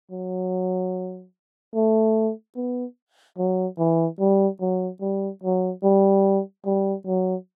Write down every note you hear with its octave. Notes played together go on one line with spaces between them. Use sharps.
F#3
A3
B3
F#3
E3
G3
F#3
G3
F#3
G3
G3
F#3